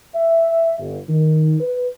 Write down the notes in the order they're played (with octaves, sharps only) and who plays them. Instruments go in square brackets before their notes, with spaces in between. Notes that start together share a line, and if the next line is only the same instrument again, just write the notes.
[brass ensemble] E5
G1
D#3
B4